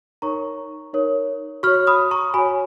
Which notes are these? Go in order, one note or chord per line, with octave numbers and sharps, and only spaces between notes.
D#4 A#4 C#5 A#5 C#6
D#4 A#4 C#5
F#4 C#5 C#6 F6
B5 D#6
A#5 C#6
F#4 C#5 G#5 B5